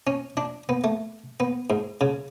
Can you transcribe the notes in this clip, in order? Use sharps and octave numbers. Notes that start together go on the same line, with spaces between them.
C#4
D4
B3
A3
B3
G#2
C#3